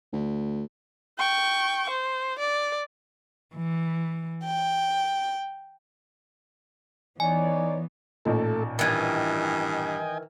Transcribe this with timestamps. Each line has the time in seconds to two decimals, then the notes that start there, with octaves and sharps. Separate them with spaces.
0.12 D2
1.18 G5 C#6
1.89 C5
2.39 D5
3.54 E3
4.44 G5
7.20 E3 B3 D#4 C#5 D5 G#5
8.25 A1 A#2 A3 D#4 A4
8.79 G2 D#3 E3 D#5 G5 G#5